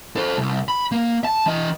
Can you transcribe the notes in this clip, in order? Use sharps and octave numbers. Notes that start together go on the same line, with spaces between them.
A4 C5
C2
B5
A#3
A5
E3 D#5